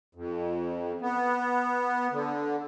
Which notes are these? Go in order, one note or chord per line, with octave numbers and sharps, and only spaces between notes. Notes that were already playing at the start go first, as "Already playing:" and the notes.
F2
B3
D3